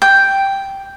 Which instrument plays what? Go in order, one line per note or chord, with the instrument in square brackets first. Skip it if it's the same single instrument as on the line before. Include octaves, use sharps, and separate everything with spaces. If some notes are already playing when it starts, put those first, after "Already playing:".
[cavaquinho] G5